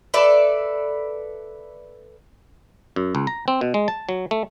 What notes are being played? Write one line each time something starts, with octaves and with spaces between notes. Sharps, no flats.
A4 B4 D5 E5
F#2
C#2
A#5
C4
B2
G#3
A5
F#3
A3